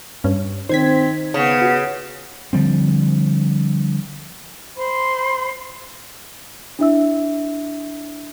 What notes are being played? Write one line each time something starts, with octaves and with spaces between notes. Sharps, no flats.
G2 C#4
D#3 C4 C5 G#6 B6
C#3 B3
F#4
D3 F3 G3 C4
C5 B5 C6
D4 E4 E5 E6